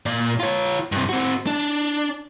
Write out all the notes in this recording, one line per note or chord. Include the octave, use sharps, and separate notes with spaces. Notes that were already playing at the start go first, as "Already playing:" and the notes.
A#2 D5
F4 C#5
G2 C3
C4 F#4
D4